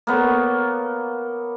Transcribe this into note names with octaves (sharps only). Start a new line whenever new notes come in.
A#3 B3 C#5